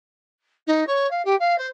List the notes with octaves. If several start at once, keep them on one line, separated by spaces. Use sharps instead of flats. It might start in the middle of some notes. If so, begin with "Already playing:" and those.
D#4
C#5
F5
G4
F5
C5